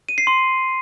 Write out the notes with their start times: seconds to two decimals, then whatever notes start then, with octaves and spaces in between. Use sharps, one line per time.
0.09 D#7
0.18 C7
0.27 C6